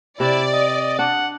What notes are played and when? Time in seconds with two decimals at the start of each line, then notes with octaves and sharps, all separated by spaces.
0.20 C3 E4 D5
0.53 D#5
0.99 D4 F#5